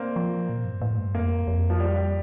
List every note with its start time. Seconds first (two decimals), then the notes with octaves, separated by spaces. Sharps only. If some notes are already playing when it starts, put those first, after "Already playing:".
Already playing: A#3 C4 D4
0.16 F3
0.49 A#2
0.65 G2
0.82 A2
0.97 G2
1.14 F2 A#3
1.48 F2
1.70 F3
1.80 G3
1.96 G3